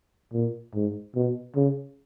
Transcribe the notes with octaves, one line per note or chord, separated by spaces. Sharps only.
A#2
G#2
B2
C#3